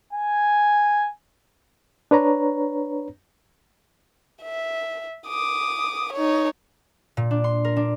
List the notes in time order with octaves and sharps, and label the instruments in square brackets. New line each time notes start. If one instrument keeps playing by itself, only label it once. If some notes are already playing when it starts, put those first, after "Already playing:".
[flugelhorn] G#5
[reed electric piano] D4 B4 C#5 A#5
[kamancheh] E5
D6 D#6
D#4 C#5
[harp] A#2
D4
C6
A#4
D4